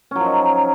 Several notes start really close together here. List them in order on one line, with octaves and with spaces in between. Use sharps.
C#4 F#3 F3 D#4